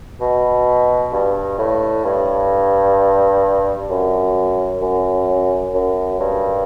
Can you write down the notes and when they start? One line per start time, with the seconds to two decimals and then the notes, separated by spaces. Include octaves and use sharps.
0.21 B2
1.12 G2
1.58 A2
2.05 G2
3.90 F#2
4.82 F#2
5.74 F#2
6.20 G2